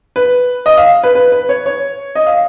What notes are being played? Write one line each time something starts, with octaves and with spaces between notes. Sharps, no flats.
B4
D#5
F5
B4
B4
B4
C#5
C#5
D#5
F5